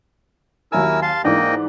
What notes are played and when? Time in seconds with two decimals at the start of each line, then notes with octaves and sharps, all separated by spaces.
0.72 D#2 F#3 E4 A#4 G#5 E6
1.02 F5 A5 C6
1.24 G#2 E3 A#3 D4 D#5 G5